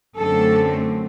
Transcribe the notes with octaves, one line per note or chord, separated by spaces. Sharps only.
F#2 D3 A3 C4 A4